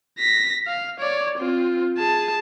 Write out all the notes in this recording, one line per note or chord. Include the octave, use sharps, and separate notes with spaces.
A#6 B6
F5
C#5 D5
C4 F4
G#4 A5